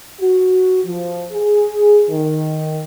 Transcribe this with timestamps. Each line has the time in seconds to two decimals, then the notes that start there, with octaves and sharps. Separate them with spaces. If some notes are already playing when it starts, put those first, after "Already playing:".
0.20 F#4
0.84 F3
1.31 G#4
2.10 D#3